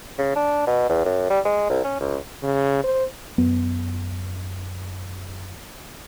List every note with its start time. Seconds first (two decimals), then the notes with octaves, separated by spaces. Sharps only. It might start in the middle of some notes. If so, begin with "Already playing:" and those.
0.18 C#3
0.36 D4
0.67 B2
0.89 E2
1.05 F#2
1.30 G3
1.45 G#3
1.70 C2
1.84 C#4
2.01 C#2
2.43 C#3
2.84 C5
3.38 F#2 B3